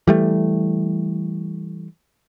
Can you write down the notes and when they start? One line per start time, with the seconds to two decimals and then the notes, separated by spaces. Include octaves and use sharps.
0.07 E3 G3 A3